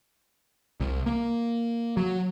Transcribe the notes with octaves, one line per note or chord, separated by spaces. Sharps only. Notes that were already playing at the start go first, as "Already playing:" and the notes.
C2
A#3
F#3